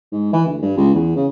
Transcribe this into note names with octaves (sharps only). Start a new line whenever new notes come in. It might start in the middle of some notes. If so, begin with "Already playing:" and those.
G#2
E3
D2
G2
C#2
E2
C#3